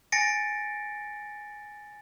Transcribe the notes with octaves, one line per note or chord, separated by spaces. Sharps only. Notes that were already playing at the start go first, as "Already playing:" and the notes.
G#5 A6 A#6 C#7 D7